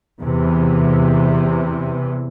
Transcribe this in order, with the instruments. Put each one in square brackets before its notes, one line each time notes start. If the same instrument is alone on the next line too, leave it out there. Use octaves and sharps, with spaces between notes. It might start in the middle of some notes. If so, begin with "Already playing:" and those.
[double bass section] E2 C3 E3